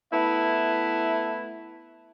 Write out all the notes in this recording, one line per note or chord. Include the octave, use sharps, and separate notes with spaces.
A3 B3 E4 B4 E5